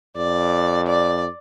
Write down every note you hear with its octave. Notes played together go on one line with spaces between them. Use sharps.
F2 D5
D5